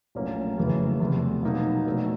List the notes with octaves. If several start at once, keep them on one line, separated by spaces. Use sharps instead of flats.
A#1 A2 F#3 A#3 C#4
F#1 F#2 C#3 E3 A3
E2 C3 E3 A3
B2 F#3 A#3 D#4 F#4
B2 F#3 A3 D4